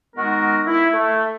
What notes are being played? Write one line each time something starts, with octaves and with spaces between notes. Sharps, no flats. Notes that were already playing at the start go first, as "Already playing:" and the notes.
D#3 G#3 B3 D#4 F#4 A#4
E4
A3